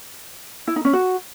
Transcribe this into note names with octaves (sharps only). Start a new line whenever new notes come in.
E4
D#4
C#4
F#4